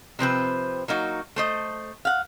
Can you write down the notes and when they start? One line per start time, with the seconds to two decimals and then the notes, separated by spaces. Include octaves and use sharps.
0.19 C3 F3 C4 B4
0.88 F#3 A#3 D#4 F#4
1.36 A3 C5 D#5
2.05 F5 F#5